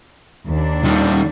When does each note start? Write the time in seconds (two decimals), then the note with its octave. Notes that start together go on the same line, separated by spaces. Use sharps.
0.48 D#2 D4
0.84 D#3 G3